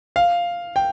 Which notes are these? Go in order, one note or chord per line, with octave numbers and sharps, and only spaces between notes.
F5
G5